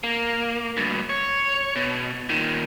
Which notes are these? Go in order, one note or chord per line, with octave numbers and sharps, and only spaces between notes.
A#3
D2 G2
C#5
B2
A#2 D#3